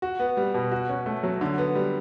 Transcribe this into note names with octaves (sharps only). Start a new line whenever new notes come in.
F#4
B3
G3
B2
F#4
C#4
A3
F#3
D3
B3
G3